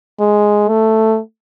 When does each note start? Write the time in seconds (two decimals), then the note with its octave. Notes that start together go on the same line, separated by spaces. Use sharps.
0.20 G#3
0.68 A3